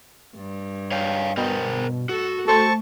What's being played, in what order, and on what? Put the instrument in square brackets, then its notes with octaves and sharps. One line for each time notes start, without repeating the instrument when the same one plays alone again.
[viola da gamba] G2
[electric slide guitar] C#5 F5 G5
[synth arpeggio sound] B2 [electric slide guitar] A#4 C5 G5
[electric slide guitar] F#4 [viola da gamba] A4
[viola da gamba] A3 [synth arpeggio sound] A4 C5 [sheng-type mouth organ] A5 C#6